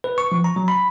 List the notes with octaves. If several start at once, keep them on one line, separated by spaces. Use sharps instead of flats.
B4
C#6
F3
A#5
F#3
B5